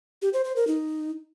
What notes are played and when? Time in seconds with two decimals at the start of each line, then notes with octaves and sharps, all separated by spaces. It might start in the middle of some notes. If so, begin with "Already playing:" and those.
0.22 G4
0.33 C5
0.45 C5
0.56 A#4
0.67 D#4